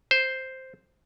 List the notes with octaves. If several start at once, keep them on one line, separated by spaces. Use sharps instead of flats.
C5